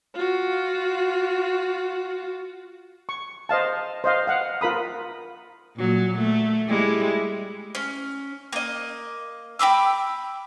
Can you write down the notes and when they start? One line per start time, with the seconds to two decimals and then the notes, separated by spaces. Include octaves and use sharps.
0.15 F4 F#4
3.09 C#6
3.49 C5 D#5 F5 A5
4.04 C5 D#5 F5
4.27 F5 F#5
4.61 F4 A#4 B5 D#6
5.76 A#2 F#3
6.18 A3
6.68 G3 G#3 E4
7.75 C#4
8.53 A#3 D#5
9.59 G5 B5 D6 E6